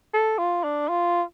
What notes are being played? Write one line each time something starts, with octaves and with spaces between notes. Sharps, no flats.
A4
F4
D4
F4